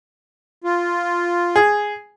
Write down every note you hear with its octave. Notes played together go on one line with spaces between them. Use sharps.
F4
G#4